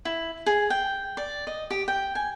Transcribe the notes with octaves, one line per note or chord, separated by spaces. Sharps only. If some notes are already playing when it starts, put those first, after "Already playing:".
E4
G#4
G5
D5
D#5
G4
G5
G#5